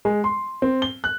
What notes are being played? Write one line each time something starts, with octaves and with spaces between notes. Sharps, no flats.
G#3
C6
C4
G7
F#6